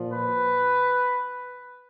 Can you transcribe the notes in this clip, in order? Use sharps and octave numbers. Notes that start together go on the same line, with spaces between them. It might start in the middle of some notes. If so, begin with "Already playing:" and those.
Already playing: A#2 F3
B4